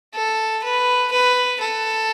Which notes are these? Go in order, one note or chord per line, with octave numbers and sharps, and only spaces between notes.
A4
B4
B4
A4